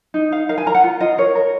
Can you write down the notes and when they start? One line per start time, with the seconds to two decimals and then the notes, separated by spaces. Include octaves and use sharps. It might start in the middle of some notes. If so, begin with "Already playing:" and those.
0.14 D#4
0.32 D#4 F5
0.49 A#4 F5
0.58 G#5
0.66 A#4 A#5
0.75 F#5
0.84 F4
1.00 F4 D#5
1.18 A#4 C#5
1.35 A#4